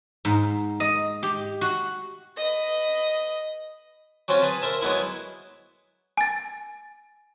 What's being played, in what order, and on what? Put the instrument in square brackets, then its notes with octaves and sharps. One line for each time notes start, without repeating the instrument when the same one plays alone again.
[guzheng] G#2
D#5
G4
F#4
[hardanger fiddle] B4 D#5
[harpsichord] F#3 C4 C#4 F4
G#4 B4 A5
A#4 C5 E5 A5
F#3 G#3 B3 E4
[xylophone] G#5 A6